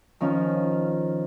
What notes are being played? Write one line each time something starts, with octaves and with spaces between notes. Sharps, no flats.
D#3 F3 C#4